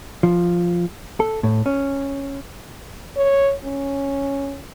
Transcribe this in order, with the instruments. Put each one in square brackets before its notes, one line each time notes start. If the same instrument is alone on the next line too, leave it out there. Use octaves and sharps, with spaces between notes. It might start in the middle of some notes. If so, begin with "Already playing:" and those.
[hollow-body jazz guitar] F3
A4
A2
C#4
[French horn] C#5
C#4